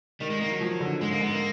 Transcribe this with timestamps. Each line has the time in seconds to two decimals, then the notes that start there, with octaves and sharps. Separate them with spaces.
0.20 D#3 G3
0.30 G#3
0.40 D#3 A#3
0.50 F#3
0.61 F3
0.80 D3
1.01 G#2 G#3
1.11 A#3
1.21 G#2 B3
1.31 A#3